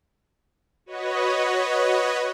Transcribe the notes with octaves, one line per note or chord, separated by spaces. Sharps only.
F#4 B4 C#5 D#5